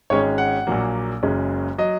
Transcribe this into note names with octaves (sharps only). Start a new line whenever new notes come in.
G#1 G#2 G#3 C#4 C#5
F#5
A#1 A#2 F#3 A#3
F#1 F#2 C#3 G#3 C#4
F#3 D#5